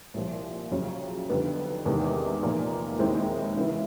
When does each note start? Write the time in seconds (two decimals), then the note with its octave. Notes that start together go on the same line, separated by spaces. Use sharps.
0.14 C2 A#2 F3
0.71 F2 C#3 F#3
1.28 F2 D3 G3 B3 D#4
1.86 E2 C3 D#3 G#3
2.43 A#2 F3 A#3 D#4
2.99 D#2 D#3 G#3 C4 E4
3.56 C#3 E3 G#3 B3 E4